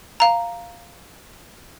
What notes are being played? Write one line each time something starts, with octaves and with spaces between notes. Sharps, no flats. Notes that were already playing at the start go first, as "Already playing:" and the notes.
F5 A#5